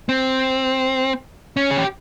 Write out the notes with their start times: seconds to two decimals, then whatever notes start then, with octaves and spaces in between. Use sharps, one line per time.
0.09 C4
1.57 C#4
1.71 G#4
1.78 G4